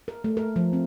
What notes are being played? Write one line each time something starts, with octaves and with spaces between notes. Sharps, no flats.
A#4
A3
A#4
F3
C4